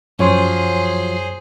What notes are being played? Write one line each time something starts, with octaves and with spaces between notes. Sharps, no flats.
F#2 F3 F#3 G#4 C5 C#5 C6